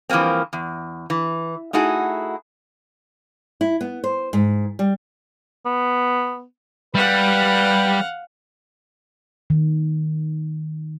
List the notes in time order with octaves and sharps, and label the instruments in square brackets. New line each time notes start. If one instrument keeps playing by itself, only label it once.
[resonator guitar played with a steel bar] E3 F3 G3 A#3 C4
E2
E3
A3 D#4 E4 F#4 G#4
[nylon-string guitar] E4
B3
C5
G#2
G3
[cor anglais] B3
[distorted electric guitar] G3 [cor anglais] B4 [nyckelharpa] F5 F#5
[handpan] D#3